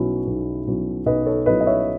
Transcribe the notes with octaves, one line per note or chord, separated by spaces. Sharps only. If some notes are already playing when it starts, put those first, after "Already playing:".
Already playing: B1 B2 F#3 C#4 E4
B1
B2 F#3 C#4 E4
B1 B4 D#5
A4 C#5
B2 F#3 C#4 E4 B4 D#5
D#5
C#5 E5